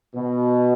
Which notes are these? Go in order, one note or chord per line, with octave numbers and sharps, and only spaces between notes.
B2